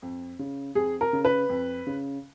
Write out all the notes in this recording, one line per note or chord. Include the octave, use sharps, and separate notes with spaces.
F2
C#3
F2 G#4
A#4
C#3
B4
F2
C#3